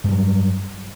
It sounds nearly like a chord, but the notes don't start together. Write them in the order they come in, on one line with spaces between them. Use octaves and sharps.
G2 G3 F#3